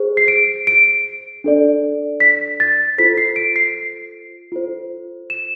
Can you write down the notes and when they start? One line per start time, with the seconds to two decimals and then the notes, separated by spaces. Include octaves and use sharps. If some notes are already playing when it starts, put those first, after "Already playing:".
Already playing: G#4 C5
0.17 C7
0.28 D7
0.67 D7
1.44 D4 A4 D5
2.20 B6
2.60 A6
2.98 F4 A4 C5 B6
3.18 C7
3.36 D7
3.56 C7
4.52 F4 A4 C5
5.30 E7